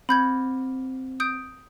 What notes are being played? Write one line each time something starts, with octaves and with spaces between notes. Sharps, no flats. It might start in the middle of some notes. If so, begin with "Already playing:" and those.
C4 B5 G6 G#6
D#6 G6 D7